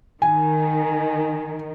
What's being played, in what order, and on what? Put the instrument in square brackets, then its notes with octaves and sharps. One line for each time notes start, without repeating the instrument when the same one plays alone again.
[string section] D#3 [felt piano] G#5